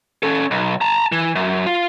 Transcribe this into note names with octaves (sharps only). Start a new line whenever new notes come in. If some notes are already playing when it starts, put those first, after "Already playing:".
C#4 A4
B1
A5 A#5
E3
F#2
F4